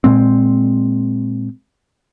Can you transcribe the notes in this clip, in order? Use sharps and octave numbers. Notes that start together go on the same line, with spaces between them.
A#2 G#3 C4